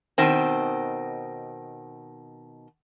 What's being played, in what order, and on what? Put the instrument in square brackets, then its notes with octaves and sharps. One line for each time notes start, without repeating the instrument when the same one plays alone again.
[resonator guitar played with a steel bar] B2 D#3 C4